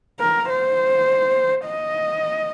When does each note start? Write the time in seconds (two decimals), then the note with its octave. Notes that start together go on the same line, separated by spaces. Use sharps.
0.20 A#4
0.49 C5
1.66 D#5